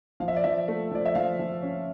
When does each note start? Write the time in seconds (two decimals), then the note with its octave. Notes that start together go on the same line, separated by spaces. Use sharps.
0.20 F3 F5
0.28 E5
0.36 D5
0.44 F3 E5
0.68 A3
0.91 F3 D5
1.05 E5
1.15 F3 F5
1.39 F3
1.62 C#4